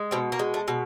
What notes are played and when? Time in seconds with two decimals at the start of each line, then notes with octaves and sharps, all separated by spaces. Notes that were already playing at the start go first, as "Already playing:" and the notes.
Already playing: G#3
0.11 B2 C4
0.32 A#3
0.39 G#3
0.54 A3
0.68 B2